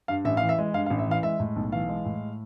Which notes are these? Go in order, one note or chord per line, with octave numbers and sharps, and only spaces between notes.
G2 F5
A1 E5
E3 F5
E5
G#3
G2 F5
F5
A1
E5
E3 F5
G#3 E5
A2
B1
E3 F5
G#3
A2